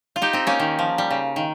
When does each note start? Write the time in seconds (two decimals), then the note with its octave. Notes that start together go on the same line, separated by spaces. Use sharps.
0.16 F4
0.22 D#4 G4
0.33 C4 D#4
0.47 A#3 C#4
0.60 D#3
0.79 F3
0.98 G3
1.10 C#3
1.36 D#3